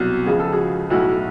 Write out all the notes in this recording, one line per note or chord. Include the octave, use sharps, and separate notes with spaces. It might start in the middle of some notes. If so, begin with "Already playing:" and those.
Already playing: C2 B2 F#3
C#2 C#3 F3 G#4
A4
F#4 G#4
B1 A2 F#3 E4 F#4